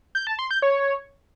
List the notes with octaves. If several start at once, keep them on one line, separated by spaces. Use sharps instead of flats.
G6
A5
C6
G6
C#5